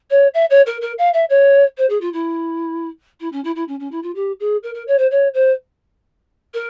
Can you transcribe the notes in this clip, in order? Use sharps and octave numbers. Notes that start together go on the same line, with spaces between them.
C#5
E5
C#5
A#4
A#4
F5
E5
C#5
C5
G#4
F4
E4
E4
C#4
E4
E4
C#4
C#4
E4
F4
G4
G#4
A#4
A#4
C#5
C5
C#5
C5
A#4